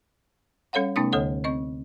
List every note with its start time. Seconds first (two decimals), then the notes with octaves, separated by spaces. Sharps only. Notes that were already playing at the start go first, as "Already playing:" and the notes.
0.73 G3 C#4 A4 C#5 F5 F#5
0.96 C3 A3 B3 C#4 D#4 D#6
1.12 D2 D3 A4 C#5 F#5
1.44 C4 D#5 C#6